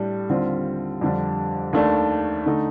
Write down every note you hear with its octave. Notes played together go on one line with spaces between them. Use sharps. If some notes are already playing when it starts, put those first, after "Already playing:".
Already playing: A2 G3 D4
D#2 D3 G3 C4 F4
F2 D3 G3 D4
D#2 D#3 A3 D4
D3 A3 D#4